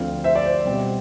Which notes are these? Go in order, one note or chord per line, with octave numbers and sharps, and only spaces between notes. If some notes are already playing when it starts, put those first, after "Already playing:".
Already playing: D2 D3 F3 A3 C4 D5 F5
C5 E5
D5
C5
B2 G3 C4